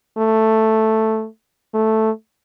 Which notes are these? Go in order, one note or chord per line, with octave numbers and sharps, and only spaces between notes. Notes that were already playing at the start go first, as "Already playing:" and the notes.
A3
A3